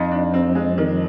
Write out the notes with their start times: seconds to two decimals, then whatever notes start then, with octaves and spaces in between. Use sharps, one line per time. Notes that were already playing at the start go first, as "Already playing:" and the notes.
Already playing: F2 D#4
0.11 D4
0.34 C4
0.55 G#3
0.78 D#3